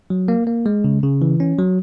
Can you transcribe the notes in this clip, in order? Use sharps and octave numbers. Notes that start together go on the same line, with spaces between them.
F#3
A#3
A#3
G#3
C#3
C#3
E3
C#4
F#3